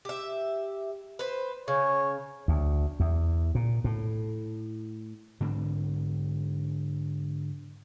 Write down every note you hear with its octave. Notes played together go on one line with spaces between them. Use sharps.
G4 E5
B4 C5
C#3 C#5
D2
E2
A#2
A2
G#2 D3 C4